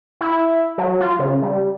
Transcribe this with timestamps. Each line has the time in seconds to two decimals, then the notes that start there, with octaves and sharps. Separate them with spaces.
0.21 E4
0.78 F#3
1.01 F4
1.19 C#3
1.42 G3